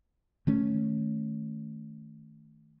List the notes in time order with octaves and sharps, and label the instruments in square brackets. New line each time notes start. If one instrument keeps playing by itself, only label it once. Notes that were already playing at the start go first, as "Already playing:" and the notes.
[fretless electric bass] D#3 A3 C#4